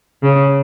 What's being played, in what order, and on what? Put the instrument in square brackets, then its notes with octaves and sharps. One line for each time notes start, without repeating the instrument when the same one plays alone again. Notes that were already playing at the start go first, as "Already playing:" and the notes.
[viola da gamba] C#3